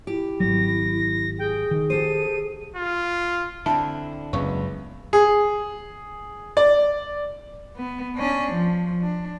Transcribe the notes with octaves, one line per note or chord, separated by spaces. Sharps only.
E4 G4
G#1 F#3 A#6
G#4 G5
D#3
G4 A4 C5 D#7
F4
D3 C4 D4 E4 A5
F#1 C#2 F#2 F#3 B3 C#6
G#4
D5
B3
C#4 D4
F3
D4